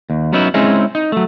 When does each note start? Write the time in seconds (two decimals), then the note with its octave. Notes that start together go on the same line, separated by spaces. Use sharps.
0.10 D#2
0.33 F#3 B3 C#4 D#4 E4
0.54 G#3 C4 C#4 D#4 E4 G#4
0.95 D#4
1.12 F#3 A3